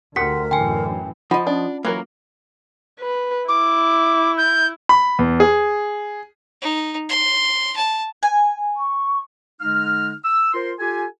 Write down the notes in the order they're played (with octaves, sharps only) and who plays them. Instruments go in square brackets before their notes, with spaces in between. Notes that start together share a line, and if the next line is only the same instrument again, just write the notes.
[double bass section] D2 [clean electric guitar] G4 C5 F#5 [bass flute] A#4 [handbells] B6
[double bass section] F#2 A2 E3 [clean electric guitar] D3 [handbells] G5 G#5
[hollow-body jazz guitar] F3 D#5 [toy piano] F4 F#5
[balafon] C#4 [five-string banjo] D4
[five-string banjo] E3 F#3 A#4 [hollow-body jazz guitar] A#3
[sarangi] B4
[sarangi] E4 [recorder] D6
[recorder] G6
[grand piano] B5
E2
G#4
[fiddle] D#4
C6
A5
[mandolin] G#5
[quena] C#6
[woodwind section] D3 G#3 D#4 F6
E6
F4 A#4 C5 C6
F4 G4 A4 G#5